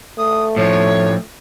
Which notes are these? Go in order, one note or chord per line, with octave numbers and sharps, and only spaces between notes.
A3 D#6
A2 F3 C#5